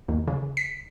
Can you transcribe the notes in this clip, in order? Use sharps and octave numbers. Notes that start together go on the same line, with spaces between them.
D#2
C#3
B6